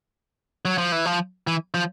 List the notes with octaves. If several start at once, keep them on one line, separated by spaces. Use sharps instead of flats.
F#3
F3
E3
F3
E3
F3